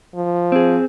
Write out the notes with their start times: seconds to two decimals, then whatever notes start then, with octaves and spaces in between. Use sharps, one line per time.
0.15 F3
0.52 C4 G#4